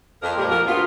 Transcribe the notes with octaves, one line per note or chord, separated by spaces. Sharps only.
F2 A#4
A#2 G3 G#3 G4 A#4
F3 F#4 A#4
D2 B3 F4